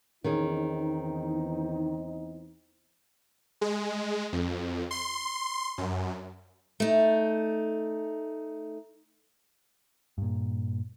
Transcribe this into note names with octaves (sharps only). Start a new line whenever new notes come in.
E2 D#3 C4 C#4 D#4 G#4
G#3
F2
C6
F#2
A3 D#4
G2 A#2